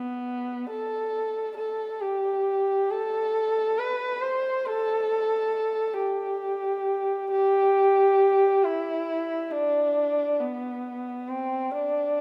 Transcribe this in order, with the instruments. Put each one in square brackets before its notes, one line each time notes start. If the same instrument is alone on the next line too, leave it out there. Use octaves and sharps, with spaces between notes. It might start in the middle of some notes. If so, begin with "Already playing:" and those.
Already playing: [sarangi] B3
A4
A4
G4
A4
B4
C5
A4
G4
G4
E4
D4
B3
C4
D4